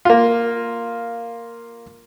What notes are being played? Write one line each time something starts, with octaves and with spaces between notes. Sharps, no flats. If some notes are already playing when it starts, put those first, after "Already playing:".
A#3 F4